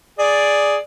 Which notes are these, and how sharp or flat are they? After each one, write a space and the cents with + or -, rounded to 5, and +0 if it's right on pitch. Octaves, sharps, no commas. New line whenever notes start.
G#4 +0 D5 +0